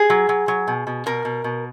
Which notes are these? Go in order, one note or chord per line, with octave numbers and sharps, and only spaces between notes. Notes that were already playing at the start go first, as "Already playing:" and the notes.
Already playing: G#4
F#3
F#3
F#3
B2
B2
B2 A#4
B2
B2